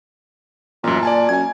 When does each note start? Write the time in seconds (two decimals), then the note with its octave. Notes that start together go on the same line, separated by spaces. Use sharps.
0.84 A1 F#2 A#2
1.03 D5 G#5 A5
1.29 F#2 G#5 G#6